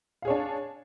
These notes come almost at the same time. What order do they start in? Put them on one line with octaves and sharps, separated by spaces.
F5 G#4 C#5 D4